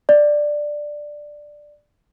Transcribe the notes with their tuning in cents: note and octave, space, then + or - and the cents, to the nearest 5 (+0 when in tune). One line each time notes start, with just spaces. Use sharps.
D5 +5